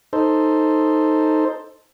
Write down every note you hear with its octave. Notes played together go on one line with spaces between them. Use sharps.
D#4 A4 C5